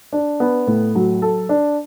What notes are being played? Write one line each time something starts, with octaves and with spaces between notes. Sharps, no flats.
D4
B3
A2
F#3
A4
D4